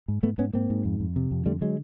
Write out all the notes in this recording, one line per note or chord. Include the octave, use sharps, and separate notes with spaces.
G#2
G#2 A3 B3
G#2 B3 C#4
G#2 A#3 C4
G#2
F2
F2
C3
F2
D3 G3 A3
D3 F#3 G#3